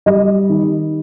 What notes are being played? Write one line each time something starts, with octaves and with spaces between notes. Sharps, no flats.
G3 D#5
D#3